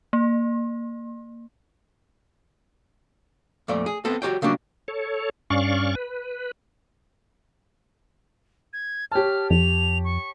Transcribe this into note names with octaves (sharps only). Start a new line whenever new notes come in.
A#3
F2 A#2 A3 D5
G#4
B3 C4 A4
F#4 G4 C#5 G5
C#3 F#3 G3 A#3 C#4 D4
A4 C#5
G2 C#4 D5 F5 C#6
B4
G#6
G4 C#5 A5 F6
F2 F7
C#6